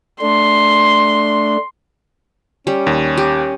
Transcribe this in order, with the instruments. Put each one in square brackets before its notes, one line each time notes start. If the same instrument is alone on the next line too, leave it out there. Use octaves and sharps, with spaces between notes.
[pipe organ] A3 D4 [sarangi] C6
[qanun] G3 [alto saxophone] C#4
[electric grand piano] D#2
[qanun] G4